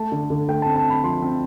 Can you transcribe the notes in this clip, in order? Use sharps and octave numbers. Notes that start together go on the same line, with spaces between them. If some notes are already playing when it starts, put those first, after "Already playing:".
Already playing: A3 A5
D3
D3
A3 G5
C4 A5
A5
C4
B5
F3 C6
C4